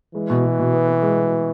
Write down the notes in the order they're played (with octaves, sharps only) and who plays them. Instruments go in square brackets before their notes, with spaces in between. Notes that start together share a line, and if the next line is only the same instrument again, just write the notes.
[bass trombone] E3 [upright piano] G#3
[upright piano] B2
B2
B2
B3
B3
G#3
G#3